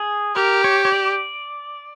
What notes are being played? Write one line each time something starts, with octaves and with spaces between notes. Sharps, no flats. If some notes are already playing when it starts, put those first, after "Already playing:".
Already playing: G#4
G4 A#4
C#5
C#5
D5